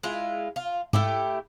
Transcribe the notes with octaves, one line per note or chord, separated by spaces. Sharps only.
G#3 E4 F4
F4
G#2 A3 E4 G4